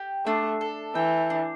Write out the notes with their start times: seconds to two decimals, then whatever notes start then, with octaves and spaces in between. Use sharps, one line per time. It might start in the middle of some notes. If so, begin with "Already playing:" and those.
Already playing: G4 G5
0.26 A3 D4
0.61 A4
0.95 E3 G5
1.30 D4